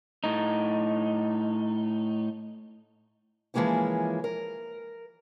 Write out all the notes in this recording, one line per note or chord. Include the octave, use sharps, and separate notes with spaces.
A2 D#4
E3 F3 G#3 A#3 C#4 E4
A#4